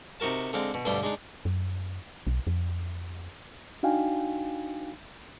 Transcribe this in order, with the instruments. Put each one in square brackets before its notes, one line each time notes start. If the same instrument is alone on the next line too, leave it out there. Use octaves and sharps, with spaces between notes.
[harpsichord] C3 D#4 F#4 A#4 A5
D3 G#3 C4 F5 A#5
B2
D2 G2 B2 D4 G5
G#3 D4 D#4
[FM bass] F#2
B1
F2
[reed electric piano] D4 D#4 F#4 F5 G5 G#5